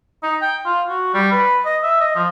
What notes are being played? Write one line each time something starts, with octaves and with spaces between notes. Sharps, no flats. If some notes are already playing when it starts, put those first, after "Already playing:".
D#4
G5
F4
F#4
G3
B4
D#5
E5
D#5
F3